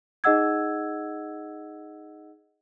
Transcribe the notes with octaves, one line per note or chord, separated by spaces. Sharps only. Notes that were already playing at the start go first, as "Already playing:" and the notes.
D#4 G#4 D#5 F#5 E6 G#6